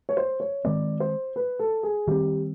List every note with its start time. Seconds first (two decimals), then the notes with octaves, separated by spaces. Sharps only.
0.09 C#5
0.17 C5
0.40 C#5
0.65 D#3 G#3 C4 D5
1.00 C5
1.36 B4
1.59 A4
1.83 G#4
2.07 D#3 G3 C4 G4